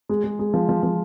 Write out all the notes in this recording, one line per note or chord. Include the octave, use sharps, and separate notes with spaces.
G#3
G#3
G#3
F3
F3
F3